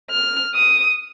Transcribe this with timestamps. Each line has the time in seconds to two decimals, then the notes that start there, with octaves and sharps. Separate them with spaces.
0.11 F6
0.54 D#6